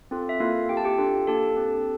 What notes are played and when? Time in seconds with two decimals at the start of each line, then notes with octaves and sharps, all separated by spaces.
0.11 C4 F4 A4
0.29 E5
0.40 A#3 E4 F4 A4 F5
0.69 C4 G4 G5
0.77 A5
0.84 G4 G5
0.98 D4 F4 A4
1.27 A#3 D4 G4 A4 A5
1.56 C4 G4